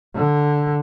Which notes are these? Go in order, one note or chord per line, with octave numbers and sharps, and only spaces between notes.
D3